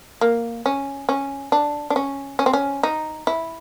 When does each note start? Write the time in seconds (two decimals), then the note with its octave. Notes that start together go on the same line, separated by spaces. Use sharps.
0.21 A#3
0.66 C#4
1.09 C#4
1.52 D4
1.90 D4
1.96 C#4
2.39 C#4
2.46 C4
2.53 C#4
2.83 D#4
3.27 E4